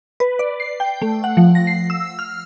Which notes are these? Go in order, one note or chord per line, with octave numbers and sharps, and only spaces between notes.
B4
D5
C7
G5
A3
F#5
F3
A#6
C7
E6
F6